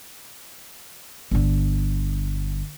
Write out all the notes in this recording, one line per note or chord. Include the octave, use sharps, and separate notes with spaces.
G1 D3